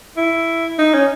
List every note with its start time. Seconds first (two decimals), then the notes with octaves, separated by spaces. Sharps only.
0.17 E4
0.79 D#4
0.94 C#4